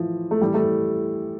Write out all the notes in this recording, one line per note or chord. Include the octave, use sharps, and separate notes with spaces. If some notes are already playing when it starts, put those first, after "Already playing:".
Already playing: A2 E3 F3
A3
A2 E3 G3
A3